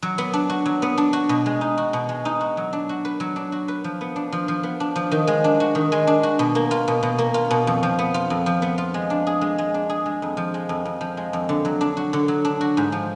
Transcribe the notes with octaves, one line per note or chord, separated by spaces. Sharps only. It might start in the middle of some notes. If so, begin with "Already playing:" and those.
F#3
B3
D4
F#4
F#3
B3
D4
F#4
B2
G#3
D#4
F#4
B2
G#3
D#4
F#4
F#3
D4
F#4
B4
F#3
D4
F#4
B4
F3
B3
D4
F3
F3
B3
D4
F3
D#3
G#3
D4
F#4
D#3
G#3
D4
F#4
B2
A#3
F4
B2
B2
A#3
F4
B2
F2
F3
B3
F4
F2
F3
B3
F4
G#3
D4
G#4
G#3
G#3
D4
G#4
G#3
F2
F3
G#3
F2
F2
F3
G#3
F2
D3
F#3
D4
F#4
D3
F#3
D4
F#4
G#2
F3